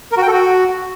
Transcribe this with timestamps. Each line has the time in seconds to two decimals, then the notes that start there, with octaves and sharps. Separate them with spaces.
0.12 A#4
0.17 F#4
0.22 G5
0.27 A4
0.32 F#4